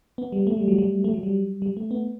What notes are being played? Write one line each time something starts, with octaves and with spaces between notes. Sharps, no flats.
B3
G3
A3
G3
F#3
G3
A3
F#3
G3
G3
A3
B3